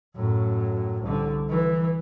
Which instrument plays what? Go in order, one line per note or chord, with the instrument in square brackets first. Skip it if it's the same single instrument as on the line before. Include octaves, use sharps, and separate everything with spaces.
[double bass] F#2 A2
C2 D3
E3